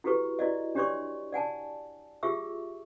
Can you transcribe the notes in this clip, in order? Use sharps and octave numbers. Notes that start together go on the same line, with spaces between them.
E4 F#4 G4 A4 B4 C#6
E4 F#4 D5 D#5
D4 G4 C#5 D5 C6 C#6
D5 F#5 G#5 A5
F4 G4 G#4 E5 C#6 E6